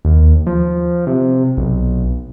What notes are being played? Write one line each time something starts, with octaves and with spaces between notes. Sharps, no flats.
D#2
F3
C3
B1